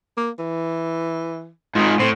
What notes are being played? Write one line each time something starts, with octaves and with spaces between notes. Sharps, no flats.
A#3
E3
G#2 D#3 F4
A2 C4